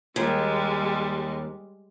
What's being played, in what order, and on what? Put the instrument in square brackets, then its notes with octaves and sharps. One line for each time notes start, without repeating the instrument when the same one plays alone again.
[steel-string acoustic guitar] D#2 [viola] G3 G#3